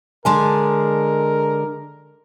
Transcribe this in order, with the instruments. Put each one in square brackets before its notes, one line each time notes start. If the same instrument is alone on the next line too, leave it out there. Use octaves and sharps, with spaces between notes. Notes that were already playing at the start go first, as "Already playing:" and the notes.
[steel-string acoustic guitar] D3 G#3 G#4 [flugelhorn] A#4 [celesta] G#5 A5 C6